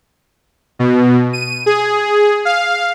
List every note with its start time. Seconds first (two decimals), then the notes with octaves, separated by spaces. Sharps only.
0.79 B2
1.33 D#7
1.66 G#4
2.45 F5